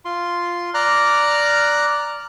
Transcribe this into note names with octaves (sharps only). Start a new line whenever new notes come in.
F4 C6
D5 A#5 F6 F#6